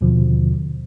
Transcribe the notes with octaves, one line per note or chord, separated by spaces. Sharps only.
D#2 B2 D3 F3